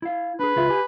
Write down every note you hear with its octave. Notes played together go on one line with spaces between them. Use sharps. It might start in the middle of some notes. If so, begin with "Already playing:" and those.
E4 F5
D4 G#4 B4
C#2 F4 E5
G4 G#5